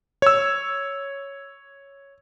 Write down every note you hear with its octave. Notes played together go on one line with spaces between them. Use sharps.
C#5 E6